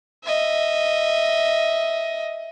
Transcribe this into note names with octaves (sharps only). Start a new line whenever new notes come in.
D#5 E5